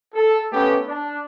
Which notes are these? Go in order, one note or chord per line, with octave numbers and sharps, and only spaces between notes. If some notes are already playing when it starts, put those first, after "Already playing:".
A4
A3 B3 C#4 G4
D4